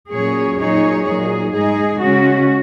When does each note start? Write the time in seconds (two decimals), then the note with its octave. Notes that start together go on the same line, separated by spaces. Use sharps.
0.10 A#2 F#3 C#4 G#4 C#5
0.58 A#2 F#3 D#4 G#4 C#5
1.05 A#2 F#3 D#4 G#4
1.53 G#2 G#3 D#4 G#4
2.00 C#3 G#3 C#4 F#4